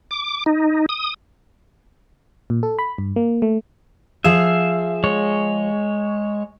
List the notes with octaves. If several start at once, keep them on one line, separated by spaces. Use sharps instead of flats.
D6
D#4
D#6
A#2
A4
B5
G2
A#3
A3
F3 G#4 E5 F5
G#3 C#5